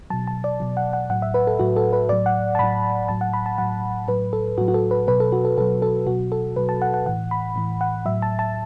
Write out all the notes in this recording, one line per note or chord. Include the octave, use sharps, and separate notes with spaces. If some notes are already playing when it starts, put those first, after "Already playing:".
B2 F#3 A5
A5
D5
B2 F#3
F#5
F#5
A2 F#3 F#5
E5
B4
A4
A2 F#3 F#4
A4
B4
A2 F#3 D5
F#5
A5
A2 F#3 B5
A2 F#3 A5
F#5
B5
A5
A2 F#3 F#5
A2 F#3 B4
A4
A2 F#3 F#4
F#4
A4
B4
B2 F#3 B4
A4
F#4
A4
B2 F#3 A4
A4
B2 F#3 F#4
A4
B2 F#3 B4
A5
F#5
F#5
A2 E3 F#5
B5
A2 E3
F#5
A2 F#3 E5
A5
A5